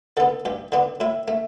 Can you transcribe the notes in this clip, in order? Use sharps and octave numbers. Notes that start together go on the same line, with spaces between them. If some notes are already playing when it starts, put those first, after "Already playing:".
D3 B3 A4
G2 G4
D3 B3 D4
A2 E4
A3